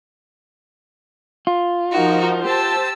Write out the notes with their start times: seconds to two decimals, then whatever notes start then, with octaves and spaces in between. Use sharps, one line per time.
1.47 F4
1.92 F3 D#4 F#4 A#4
2.43 G4 C5 A5 E6